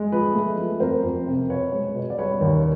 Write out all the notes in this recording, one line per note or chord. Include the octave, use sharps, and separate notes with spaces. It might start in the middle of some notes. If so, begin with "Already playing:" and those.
Already playing: G#3
F3 B4
A3
F3
F2 A#4 C5
F2
C3
B2 B4 C#5
G#3
B2
D5
G3 B4 C#5
D#2